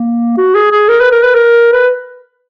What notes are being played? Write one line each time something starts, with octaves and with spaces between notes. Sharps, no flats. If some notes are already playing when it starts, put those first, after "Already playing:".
Already playing: A#3
F#4
G#4
G#4
A#4
B4
A#4
B4
A#4
B4